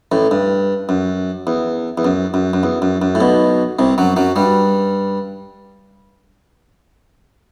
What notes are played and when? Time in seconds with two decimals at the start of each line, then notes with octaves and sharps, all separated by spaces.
0.12 A1 A2
0.31 G2
0.89 F#2
1.47 E2
1.98 E2
2.05 F#2
2.34 F#2
2.53 F#2
2.63 E2
2.82 F#2
3.02 F#2
3.15 A2
3.20 B1 B2
3.79 C2 C3
3.98 F#2 F#3
4.17 F#2 F#3
4.36 G2 G3